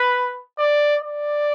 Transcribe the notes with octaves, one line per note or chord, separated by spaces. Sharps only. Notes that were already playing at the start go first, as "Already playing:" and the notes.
Already playing: B4
D5
D5